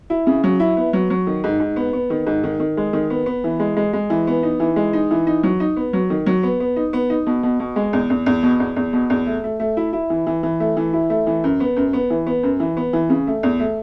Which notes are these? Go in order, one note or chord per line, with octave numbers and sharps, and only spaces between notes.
E4
C#3
F#3
E4
B3
F#3
F#3
D#3
G#2
G#2
B3
B3
D#3
G#2
D#3
D#3
G#3
D#3
B3
B3
E3
G#3
G#3
G#3
E3
B3
D#4
E3
G#3
D#4
E3
D#4
F#3
D#4
B3
F#3
D#3
F#3
B3
B3
D#4
B3
D#4
B2
B2
B2
G#3
E2
E2
E2
B2
E2
E2
B2
E2
A3
A3
A3
E4
E4
E3
E3
E3
A3
E3
E4
A3
E3
F#2
B3
F#2
B3
E3
B3
F#2
E3
B3
E3
C#3
A3
E2
A3